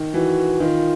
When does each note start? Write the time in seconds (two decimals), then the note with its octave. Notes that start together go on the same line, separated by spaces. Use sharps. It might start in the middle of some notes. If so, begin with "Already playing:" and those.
Already playing: D#3
0.14 E3 F#4
0.60 D#3 F4